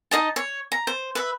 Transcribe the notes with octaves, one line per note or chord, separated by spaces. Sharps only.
D#4 G#4 D#5 A5
C#5
A#5
C5
B4 E5